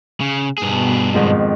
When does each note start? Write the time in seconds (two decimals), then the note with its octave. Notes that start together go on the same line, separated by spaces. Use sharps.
0.21 C#3
0.58 G2 B2 B3 G#4
1.14 F2 G#2 D#3